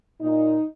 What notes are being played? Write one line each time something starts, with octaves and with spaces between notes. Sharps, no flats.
A#2 D#4